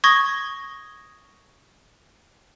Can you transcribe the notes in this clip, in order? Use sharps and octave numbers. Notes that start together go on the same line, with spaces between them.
C#6 D#6 G#6 A#6 G7